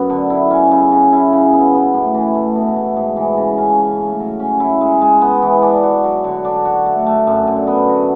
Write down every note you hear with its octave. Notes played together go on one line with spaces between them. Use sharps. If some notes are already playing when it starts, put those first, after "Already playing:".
Already playing: F#2 B3
D3
E4
C#4
C#3
C#3
E4
C#3
B3
B3
A2
E3
A3
B2
A3
G#2
E3
C#3
C#4
C#4
A2
F#3
C#4
E4
G#3
G#3
B3
E3
D4
F#4
F#3
D3
D4
F#4
A3
A3
F#2
D3
B3
F#4